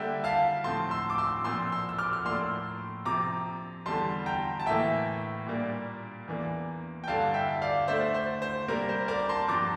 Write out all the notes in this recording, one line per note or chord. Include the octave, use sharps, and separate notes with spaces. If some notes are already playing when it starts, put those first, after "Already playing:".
Already playing: D3 G3 A#3 D4 E5 G5
F5 A5
A2 F3 C4 A5 C6
C6 E6
D6
C6 E6
A#2 F3 C4 C6 E6
C6 E6
E6
D6 F6
F6
A2 F3 A#3 D4 C6 E6
C3 F3 C4 A#5 D6
E2 D3 G3 A5 C6
G5 A#5
A5
A2 E3 A#3 E5 G5
A#2 G3 A#3 D4
E2 E3 A#3 D4
G5
G2 D3 G3 D4 F5 A5
E5 G5
D5 F5
D3 A3 D4 C5 E5
C5
C5
C3 G3 A#3 D4 A#4
C5
A#4 D5
A#5
A5 C6
G2 F3 C4 A#5 D6